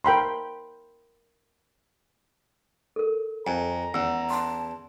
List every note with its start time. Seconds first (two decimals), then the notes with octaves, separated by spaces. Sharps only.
0.05 A#4 G5 B5 C6
2.96 A4 A#4
3.47 F2 G#5 A#5
3.94 E2 C#4 F#5 E6
4.30 A5 C6